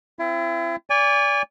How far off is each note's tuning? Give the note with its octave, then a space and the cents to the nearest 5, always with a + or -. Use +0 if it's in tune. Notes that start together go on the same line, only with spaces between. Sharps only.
C4 +0 E4 +40
D5 -25 G#5 -30